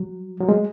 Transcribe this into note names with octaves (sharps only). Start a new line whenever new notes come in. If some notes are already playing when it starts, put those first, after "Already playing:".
Already playing: F#3
F#3
G#3